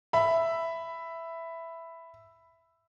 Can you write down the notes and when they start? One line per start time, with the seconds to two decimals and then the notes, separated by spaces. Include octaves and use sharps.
0.13 E5 B5